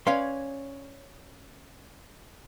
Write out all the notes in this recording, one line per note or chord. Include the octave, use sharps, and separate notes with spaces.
C#4 B4 C#5 D5 F5 C6